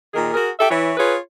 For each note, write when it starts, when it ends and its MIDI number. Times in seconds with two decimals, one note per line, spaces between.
0.14 0.30 46
0.14 0.30 51
0.14 0.30 68
0.14 0.30 70
0.34 0.49 66
0.34 0.49 68
0.34 0.49 70
0.60 0.67 67
0.60 0.67 69
0.60 0.67 76
0.71 0.92 52
0.71 0.92 73
0.98 1.16 65
0.98 1.16 68
0.98 1.16 71
0.98 1.16 73